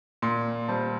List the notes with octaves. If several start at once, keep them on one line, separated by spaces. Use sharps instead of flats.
A#2 C6
G3 C4 A5